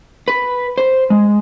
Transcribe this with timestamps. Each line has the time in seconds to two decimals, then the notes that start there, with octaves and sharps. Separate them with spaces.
0.28 B4
0.78 C5
1.10 G#3